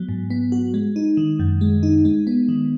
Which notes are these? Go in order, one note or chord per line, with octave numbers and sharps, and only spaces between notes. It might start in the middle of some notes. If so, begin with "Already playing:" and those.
Already playing: F#3 B3
G#2
B3
F#4
G#3
D#4
D#3
F#2
G#3
D#4
G#3
B3
D#3